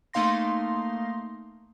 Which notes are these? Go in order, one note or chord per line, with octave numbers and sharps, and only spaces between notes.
A3 A#3 D#4 F5 C6 A#6